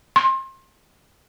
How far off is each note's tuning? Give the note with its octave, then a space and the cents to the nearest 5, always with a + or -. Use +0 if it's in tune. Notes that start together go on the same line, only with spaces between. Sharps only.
C6 +30